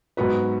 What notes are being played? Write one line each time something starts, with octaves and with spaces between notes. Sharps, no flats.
G#2 F#3 B3 F#4 B4